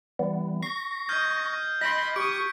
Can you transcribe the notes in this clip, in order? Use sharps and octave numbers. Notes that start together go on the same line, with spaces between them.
E3 G3 B3
C#6 A#6 C7
D#5 F6 G6 G#6
D#5 B5 C6 B6 D7
G4 C#6 D#6 D7